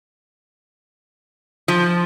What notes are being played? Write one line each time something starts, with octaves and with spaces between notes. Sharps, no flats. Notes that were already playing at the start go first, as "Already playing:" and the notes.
F3